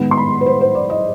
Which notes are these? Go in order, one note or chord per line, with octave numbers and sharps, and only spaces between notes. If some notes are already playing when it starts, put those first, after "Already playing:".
Already playing: D#3 G#3 B3
C6
B5
B4
C5
C5
D5
D#5